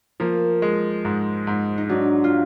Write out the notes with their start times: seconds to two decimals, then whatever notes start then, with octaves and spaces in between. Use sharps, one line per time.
0.20 F3 A#3
0.62 G#3
1.05 G#2
1.47 G#2
1.78 D#4
1.89 F#3 D4
2.24 F4